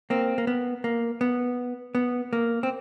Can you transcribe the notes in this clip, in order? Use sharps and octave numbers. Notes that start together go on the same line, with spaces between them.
A#3 C4
A#3
B3
A#3
B3
B3
A#3
C4